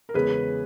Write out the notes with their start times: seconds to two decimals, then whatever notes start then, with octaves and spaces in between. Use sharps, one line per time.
0.09 A#4
0.14 E2 C#3 G#3 G#4 B4